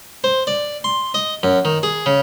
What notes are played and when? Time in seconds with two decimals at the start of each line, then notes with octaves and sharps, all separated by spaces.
0.24 C5
0.47 D5
0.84 C6
1.14 D#5
1.43 F#2
1.65 D#3
1.83 G#4
2.06 C#3